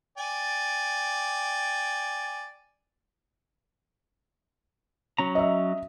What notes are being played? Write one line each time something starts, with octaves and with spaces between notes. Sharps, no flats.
D5 G5 G#5
F#3 C#4 A#5
D#5 E5